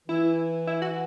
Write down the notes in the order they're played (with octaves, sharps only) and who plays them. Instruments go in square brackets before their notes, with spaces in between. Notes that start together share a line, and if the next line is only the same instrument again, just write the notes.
[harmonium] E3 [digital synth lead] E4
[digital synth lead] E4
F#4